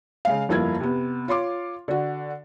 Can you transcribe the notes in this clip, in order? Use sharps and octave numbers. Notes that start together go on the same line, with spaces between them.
C#3 G#3 F5
G1 F2 A#3 E4 F4 G#6
C3 B3
F4 C#5 C6 D6
D3 F#4